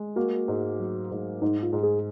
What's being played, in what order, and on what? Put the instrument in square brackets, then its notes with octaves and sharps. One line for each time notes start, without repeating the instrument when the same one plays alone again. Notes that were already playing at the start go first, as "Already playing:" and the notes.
Already playing: [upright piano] G#3
[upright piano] A#3 [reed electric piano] F#4
[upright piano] G#2
F#3
G#2
[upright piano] G#2 [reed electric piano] D#4
[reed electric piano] F4
[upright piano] G#2
[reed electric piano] G#4